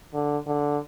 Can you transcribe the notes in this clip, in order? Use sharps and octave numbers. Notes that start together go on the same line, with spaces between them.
D3
D3